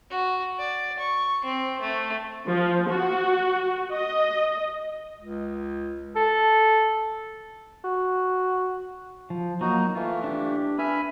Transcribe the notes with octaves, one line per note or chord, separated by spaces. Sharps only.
F#4
D5
C#6
C4
A3
F3
F#4
D#5
C#2
A4
F#4
F3
F#3 A#3 D#4 F#4 D#5
E3 A3 F4
D4 G4
D4 B4 E5 G#5 B5 F6